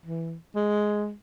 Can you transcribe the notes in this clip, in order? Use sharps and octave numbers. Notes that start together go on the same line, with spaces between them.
E3
G#3